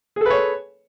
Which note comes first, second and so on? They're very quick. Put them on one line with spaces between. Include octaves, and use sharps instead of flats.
G#4 A4 B4 C#5